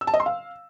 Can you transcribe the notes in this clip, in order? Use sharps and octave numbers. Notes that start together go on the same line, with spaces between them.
E6
A5
D#5
C6
F5